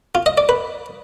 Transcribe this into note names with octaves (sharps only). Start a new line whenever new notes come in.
F4
D#5
D5
B4